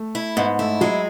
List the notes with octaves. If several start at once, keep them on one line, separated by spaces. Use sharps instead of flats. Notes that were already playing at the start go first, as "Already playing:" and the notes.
Already playing: A3
E4
G#2 B3
A3 E4
F#3 G#3